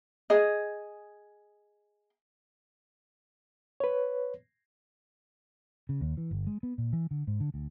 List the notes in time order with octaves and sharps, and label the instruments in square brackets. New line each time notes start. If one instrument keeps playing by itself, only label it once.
[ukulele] G#4 D#5
[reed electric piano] B4 C#5
[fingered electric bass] C#3
D#2
E3
G1
G#3
B3
A#2
E3
D3
G#2
D3
D2